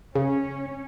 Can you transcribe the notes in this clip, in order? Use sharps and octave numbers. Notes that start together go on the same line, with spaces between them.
C#3 C#4